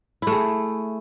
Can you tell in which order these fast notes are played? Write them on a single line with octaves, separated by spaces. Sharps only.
E4 A3 G#4